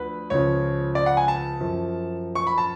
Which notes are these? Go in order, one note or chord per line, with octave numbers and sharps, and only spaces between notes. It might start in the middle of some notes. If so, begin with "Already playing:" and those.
Already playing: D2 D3 F3 B4
C#2 C#3 F3 C#5
D5
F#5
G#5
A5
F#2 F3
C#6
B5
A5